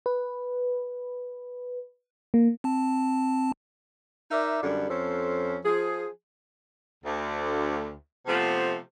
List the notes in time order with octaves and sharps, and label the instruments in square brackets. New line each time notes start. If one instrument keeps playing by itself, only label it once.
[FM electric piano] B4
A#3
[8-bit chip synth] C4 A5
[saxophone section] D#4 A#4 D5 E5
F#2 D3 G3 D4 A4
F2 F3 C#4 A4 C5
F3 G#4
D2
C3 F3 A3 B3